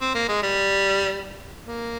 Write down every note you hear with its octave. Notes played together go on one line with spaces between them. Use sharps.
C4
A#3
G#3
G3
A#3